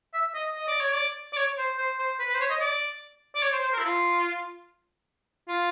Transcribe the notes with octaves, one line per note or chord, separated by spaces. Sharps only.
E5
D#5
D#5
D5
C#5
D5
D5
C#5
C5
C5
C5
B4
B4
C5
C#5
D#5
D5
D5
C#5
C5
C5
A#4
E4
F4
F4